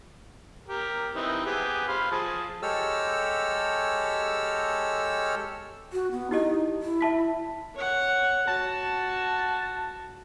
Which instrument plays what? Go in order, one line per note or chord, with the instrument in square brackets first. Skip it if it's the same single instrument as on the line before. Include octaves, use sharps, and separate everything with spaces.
[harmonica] G4 A#4
E3 C4 D#4
B3 G4 G#4
C5 F5 B5
F3 G#4 A5
[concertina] G#3 G4 A4 C#5 E6 F6
[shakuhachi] F#4
B3
[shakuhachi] D#4 [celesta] E4 G4 D#5
[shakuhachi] E4
[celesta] E5 A5 B6
[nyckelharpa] C#5 F#5
[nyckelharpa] F#4 [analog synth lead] A5